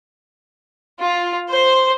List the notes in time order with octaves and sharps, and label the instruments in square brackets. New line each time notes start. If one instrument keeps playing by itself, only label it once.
[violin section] F4
C5